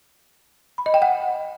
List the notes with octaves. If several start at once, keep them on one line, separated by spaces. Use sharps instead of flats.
B5
D#5
G5
F#5